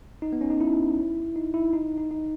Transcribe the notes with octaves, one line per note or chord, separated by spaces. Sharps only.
D#4
B3
C#4
D#4
E4
D#4
E4
D#4
D#4
D#4